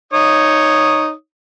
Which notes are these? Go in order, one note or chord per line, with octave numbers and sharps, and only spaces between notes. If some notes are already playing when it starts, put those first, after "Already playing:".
D#4 C#5 D#6